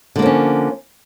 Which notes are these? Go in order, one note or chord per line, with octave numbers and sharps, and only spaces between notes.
D3 F3 A#3 C#4